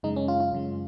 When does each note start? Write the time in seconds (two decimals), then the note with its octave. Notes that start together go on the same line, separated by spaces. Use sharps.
0.03 F#2 C#3 G#3 D#4
0.16 C#4
0.28 F4
0.40 F4
0.52 F#2 C#3 G#3